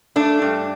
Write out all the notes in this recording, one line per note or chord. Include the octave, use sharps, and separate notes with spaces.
A3 D4
G2